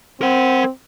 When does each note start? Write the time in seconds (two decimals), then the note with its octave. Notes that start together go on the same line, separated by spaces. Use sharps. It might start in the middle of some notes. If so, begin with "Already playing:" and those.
0.21 C4 A#4 F#5